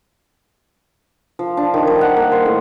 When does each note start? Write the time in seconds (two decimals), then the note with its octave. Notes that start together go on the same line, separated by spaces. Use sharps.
1.39 F3
1.57 D4
1.74 D#3
1.87 G3
2.01 F#5
2.16 A#3
2.32 C5
2.45 A2